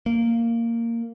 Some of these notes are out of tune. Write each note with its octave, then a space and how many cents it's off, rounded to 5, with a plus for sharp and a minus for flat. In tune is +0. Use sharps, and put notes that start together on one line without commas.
A#3 -10